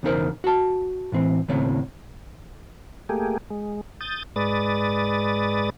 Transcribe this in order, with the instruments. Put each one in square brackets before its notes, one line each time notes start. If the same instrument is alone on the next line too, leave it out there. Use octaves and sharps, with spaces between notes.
[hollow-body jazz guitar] B1 E2 C#3 D#4 A#4 C5
F#4 A5
A2 E3 C4
D#2 A2 C#3 C4 C#5
[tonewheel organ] A3 A#3 G4 G#4
G#3
D#6 G6 A6
G#2 G#3 B4 D5 D#6 A6